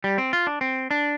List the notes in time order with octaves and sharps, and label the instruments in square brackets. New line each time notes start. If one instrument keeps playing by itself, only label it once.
[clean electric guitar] G3
C4
F4
D4
C4
D4